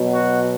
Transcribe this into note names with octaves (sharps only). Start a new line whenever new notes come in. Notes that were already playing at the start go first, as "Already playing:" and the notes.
Already playing: B2 F#3
F#4